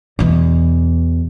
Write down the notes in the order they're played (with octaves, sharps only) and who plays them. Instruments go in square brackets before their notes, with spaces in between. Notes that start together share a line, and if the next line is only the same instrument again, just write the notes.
[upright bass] E2 B2